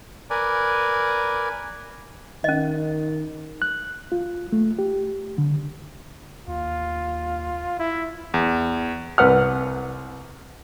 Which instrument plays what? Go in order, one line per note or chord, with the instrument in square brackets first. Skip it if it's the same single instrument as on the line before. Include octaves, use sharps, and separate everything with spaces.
[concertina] A#4 B4 D5 G#5
[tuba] D#3 [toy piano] C#4 D#5
[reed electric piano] F#6
F4
A3
G4
D3
[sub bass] D#2 [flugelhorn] F4
[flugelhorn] E4
[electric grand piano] E2
[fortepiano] C2 B4 F#5 F6